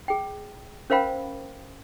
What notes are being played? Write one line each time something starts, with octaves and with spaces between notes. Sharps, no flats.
G#4 G5
C#4 A#4 C5 F5 G5 B5